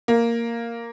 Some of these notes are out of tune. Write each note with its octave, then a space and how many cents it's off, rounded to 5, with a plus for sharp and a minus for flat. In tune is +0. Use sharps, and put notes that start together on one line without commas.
A#3 -5